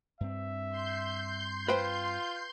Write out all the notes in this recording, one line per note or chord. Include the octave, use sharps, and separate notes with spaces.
G2 C4 E5
C6 G6
F4 B4 C5 G5